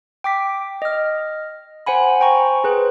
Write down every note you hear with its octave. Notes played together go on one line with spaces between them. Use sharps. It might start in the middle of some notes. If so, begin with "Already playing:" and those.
G5 D6 B6
D#5 F6
C5 F#5 G#5 B5
C5 G5 G#5 A#5 C#6
G#4 B4 C5